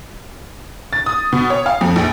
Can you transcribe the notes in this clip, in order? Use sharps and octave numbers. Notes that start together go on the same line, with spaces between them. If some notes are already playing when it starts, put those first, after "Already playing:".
A6
D#6
B2
C#5
F5
F2
A#1